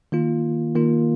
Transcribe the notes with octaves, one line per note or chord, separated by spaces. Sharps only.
D#3 A#3 F4
D#3 A#3 F4